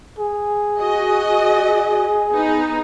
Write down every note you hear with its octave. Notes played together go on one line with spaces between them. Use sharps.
G#4
F#4 D#5
B3 D#4